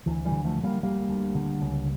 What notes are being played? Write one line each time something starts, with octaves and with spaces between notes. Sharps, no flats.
D2 E3
E3 G3
D3
F3 A3
D3
G3 A#3
D2 G3 A#3
D2
D3
C#2